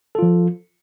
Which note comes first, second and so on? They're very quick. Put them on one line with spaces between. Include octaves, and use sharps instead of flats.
A4 F4 F3